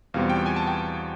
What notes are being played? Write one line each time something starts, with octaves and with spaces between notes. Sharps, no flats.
E2 B2 G3 C4 F4 F5
G5
G#5
A5
G5